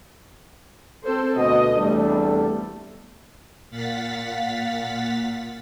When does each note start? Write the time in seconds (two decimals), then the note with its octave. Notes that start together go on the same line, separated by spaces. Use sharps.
1.03 C4 A4 C5
1.38 D2 B2 D#5
1.77 E2 C3 G3 A3 D4 A4
3.70 A#2 F5 F#5 A6 B6